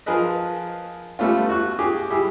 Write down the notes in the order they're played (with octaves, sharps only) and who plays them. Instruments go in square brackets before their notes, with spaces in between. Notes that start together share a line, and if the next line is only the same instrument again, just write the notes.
[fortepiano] F3 G#4 A#4 B4 D#5
G3 A3 B3 C#4 F4
F#4 C#6 F#6
G4 G#4 G#5 D6
G3 E4 G4 G#4